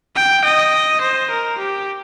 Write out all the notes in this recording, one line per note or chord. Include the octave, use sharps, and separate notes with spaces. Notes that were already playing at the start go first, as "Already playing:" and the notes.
G5
D#5
C5
A#4
G4